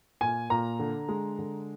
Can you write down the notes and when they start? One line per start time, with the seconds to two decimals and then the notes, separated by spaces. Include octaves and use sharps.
0.21 A#2 G#5
0.50 A#2 A#5
0.79 D3
1.09 G#3
1.39 D3